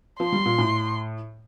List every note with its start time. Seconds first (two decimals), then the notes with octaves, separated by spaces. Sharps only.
0.20 F3 C6
0.32 G3
0.46 A#2
0.58 A2